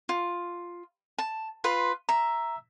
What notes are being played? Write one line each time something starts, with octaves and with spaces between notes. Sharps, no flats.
F4
A5
F4 B4 C6
E5 A#5